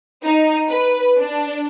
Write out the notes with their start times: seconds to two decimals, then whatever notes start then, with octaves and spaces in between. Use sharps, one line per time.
0.24 D#4
0.68 B4
1.18 D4